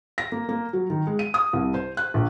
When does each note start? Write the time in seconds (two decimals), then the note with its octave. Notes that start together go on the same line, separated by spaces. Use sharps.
0.18 A#6
0.32 A#3
0.49 A#3
0.73 F#3
0.90 D#3
1.07 G#3
1.19 D#7
1.34 D#6
1.53 C2
1.74 C5
1.97 F#6
2.14 A#1